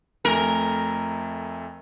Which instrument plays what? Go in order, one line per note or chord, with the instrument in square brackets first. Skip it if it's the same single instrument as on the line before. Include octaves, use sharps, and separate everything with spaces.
[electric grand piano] F2 A3 G#5 [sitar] A#4